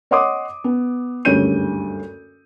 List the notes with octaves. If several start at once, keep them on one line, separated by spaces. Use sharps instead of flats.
C#5 D#5 F#5 C6 D6 D#6
B3
F#1 D2 G2 C#5 G6 D#7